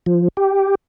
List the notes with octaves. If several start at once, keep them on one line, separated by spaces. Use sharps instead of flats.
F3
G4